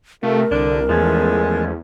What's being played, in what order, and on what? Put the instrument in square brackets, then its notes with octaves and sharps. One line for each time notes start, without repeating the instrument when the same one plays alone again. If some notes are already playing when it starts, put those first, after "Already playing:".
[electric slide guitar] C3 [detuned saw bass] A3 [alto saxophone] F4 [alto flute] A#4
[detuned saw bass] C2 [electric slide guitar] D3 [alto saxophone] D4
[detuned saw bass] E2 [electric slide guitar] F3 A3 C#4 [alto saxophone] G#3